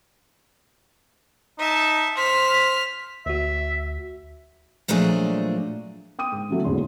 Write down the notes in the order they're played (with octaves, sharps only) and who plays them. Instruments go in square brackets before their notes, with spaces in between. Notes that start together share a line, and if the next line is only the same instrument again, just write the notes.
[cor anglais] D#4 [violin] E5 A5
[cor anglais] C5 [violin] F6 B6
[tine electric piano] D2 F#4 [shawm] E5
[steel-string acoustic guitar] A#2 F3 F#3 A3 D4 G#4
[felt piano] G5 D#6 D#7
G#2
D3 E3 F#3 A3
D#1 E2 G#2 D3 G#4 C6